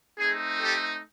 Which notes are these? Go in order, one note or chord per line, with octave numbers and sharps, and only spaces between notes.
A3 C4 D#4 G#4
G4 A4